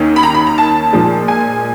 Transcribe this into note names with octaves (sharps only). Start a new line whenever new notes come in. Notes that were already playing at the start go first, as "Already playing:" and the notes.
Already playing: D#2 D#3 A#3 C#4
B5
A#5
B5
A#5
A5
A#2 F3 G#3
G#5